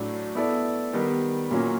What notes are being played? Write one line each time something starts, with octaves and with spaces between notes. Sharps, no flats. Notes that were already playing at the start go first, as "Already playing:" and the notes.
Already playing: A2 F#3 A3 D4
B3 E4 A4 D5
D#3 G3 B3
A#2 F#3 A#3 C#4